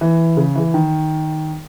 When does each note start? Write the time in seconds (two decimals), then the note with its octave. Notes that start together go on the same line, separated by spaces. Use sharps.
0.01 E3
0.37 C#3
0.56 E3
0.74 D#3